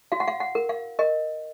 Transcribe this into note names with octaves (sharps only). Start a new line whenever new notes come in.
F#4 F5
F#5
F5
F#5
A#4
F5
A#4 D#5